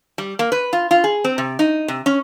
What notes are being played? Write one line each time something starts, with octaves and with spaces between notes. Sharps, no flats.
G3
A#3
B4
F4
F4
G#4
C4
C3
D#4
C3
C#4